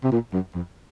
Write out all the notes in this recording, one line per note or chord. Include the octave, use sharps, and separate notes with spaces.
C3
A#2
F#2
F2